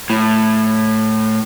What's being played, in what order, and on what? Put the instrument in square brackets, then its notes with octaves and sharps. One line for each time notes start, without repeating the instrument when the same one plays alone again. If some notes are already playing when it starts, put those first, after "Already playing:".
[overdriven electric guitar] A2